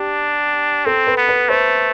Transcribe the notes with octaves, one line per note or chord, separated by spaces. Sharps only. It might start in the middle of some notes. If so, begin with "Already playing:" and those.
Already playing: D4 G4
C4 A4
B4
B3
B4
A3 C5